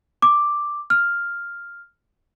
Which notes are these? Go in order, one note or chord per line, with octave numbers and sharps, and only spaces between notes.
D6
F6